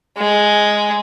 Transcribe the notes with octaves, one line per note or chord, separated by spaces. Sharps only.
G#3